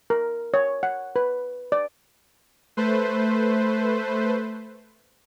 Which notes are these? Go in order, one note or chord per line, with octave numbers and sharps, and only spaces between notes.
A#4
C#5
F#5
B4
D5
A3 B4 C5